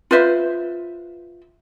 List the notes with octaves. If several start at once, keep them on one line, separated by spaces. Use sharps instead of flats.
F4 B4 C5 E5